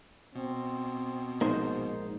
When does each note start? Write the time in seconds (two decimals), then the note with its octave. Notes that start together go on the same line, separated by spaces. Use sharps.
0.35 B2 C4
1.41 A#1 G#2 A#3 D#4 C5